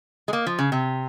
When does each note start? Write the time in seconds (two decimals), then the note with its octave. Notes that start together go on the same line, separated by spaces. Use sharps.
0.28 G#3
0.33 A#3
0.46 F3
0.59 C#3
0.72 C3